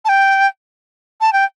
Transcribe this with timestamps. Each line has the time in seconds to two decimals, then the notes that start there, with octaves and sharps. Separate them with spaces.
0.05 A5
0.09 G5
1.21 A5
1.33 G5